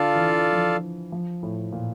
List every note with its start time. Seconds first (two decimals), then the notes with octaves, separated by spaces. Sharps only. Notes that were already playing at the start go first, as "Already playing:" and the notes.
Already playing: D3 F4 A4 D5 F5 A5
0.15 E3
0.23 D3
0.52 F3
1.12 F3
1.43 A2
1.72 A#2